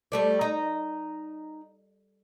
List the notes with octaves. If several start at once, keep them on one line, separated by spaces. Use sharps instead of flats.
G3 A3 D5
D#4